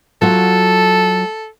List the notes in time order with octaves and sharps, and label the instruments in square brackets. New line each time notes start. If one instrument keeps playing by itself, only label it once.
[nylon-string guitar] F#3 F4 F#4 [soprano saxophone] A4